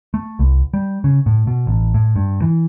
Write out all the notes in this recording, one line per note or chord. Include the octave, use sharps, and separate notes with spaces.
A3
C2
G3
C#3
A2
B2
A1
A2
G2
E3